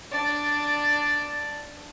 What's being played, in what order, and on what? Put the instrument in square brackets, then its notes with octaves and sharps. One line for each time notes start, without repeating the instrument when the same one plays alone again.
[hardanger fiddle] D4 D5